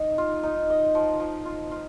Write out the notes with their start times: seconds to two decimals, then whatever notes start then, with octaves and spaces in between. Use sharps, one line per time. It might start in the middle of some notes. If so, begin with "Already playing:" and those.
Already playing: D#4 F5
0.18 F4
0.43 D#4
0.70 D#5
0.95 F3
1.20 F3
1.45 F4
1.71 F4